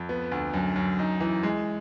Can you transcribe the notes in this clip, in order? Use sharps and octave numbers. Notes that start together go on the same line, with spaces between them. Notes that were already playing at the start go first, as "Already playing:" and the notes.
Already playing: F2
B3
D2
F#2
F#2
D#4
E3
G#3